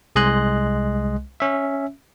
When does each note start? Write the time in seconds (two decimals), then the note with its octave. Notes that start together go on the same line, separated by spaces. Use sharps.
0.16 C2 G#3 D#5 G#5 C6 F#6
1.40 C#4 E5